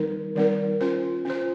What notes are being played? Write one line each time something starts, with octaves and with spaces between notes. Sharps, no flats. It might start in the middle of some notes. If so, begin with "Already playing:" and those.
Already playing: D#3 G3 C4 D#4 A#4
D#3 G3 C4 D#4 A#4
C#4 F4 C5
C#4 F4 C5